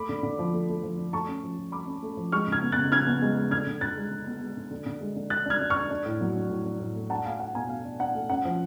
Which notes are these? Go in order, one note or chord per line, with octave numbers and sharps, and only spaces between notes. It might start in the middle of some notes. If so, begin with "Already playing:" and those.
Already playing: A3 B5 D6
D3
D3
F3
A3
A3
F3
D4
A3 A5 C#6
C#4
F3
F3
A3 B5 D6
C#4
A3
F3
G#3 C#6 F6
C#3
F6 G#6
B3
F#6 A6
C#3
C#3 F6 G#6
B3
G#3
G#3
D3 F6 G#6
D3
D3 F#6 A6
G#3
D3
B3
G#3
D3
D3
D3
G#3
D3
D4 F#6 A6
D4 F6 G#6
D4
C#6 F6
D4
D4
A2
F#3
D4
A2
D4
A2
A3
D4 F#5 A5
A3 F5 G#5
D4 F#5
B2 F5 G#5
D4 F5
D4
D4 F#5
A3
C#4 F#5
F3